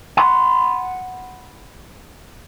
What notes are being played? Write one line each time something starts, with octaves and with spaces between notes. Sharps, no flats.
F#5 B5 C6